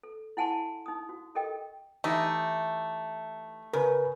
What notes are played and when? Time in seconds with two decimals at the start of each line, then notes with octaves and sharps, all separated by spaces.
0.03 A4
0.37 E4 F#5 G#5 A5 C6 C#6
0.86 D#4 D#6
1.09 F#4
1.35 G4 A4 A#4 D#5 G5
2.04 E3 A3 D#4 G4
3.73 C#3 A#4 B4